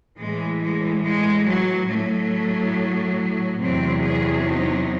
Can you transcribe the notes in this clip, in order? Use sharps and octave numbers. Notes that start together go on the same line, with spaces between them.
A2 E3 G#3
G#3
G#3
F#3
A2 F#3 A3
E2 C3 F#3 C4
G#4
D#4